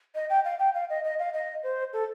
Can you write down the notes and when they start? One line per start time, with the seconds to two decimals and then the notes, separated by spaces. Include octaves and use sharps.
0.15 D#5
0.30 G5
0.45 F5
0.59 G5
0.74 F5
0.90 D#5
1.04 D#5
1.19 F5
1.34 D#5
1.63 C5
1.93 A4